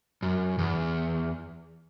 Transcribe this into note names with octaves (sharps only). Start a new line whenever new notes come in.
F#2
E2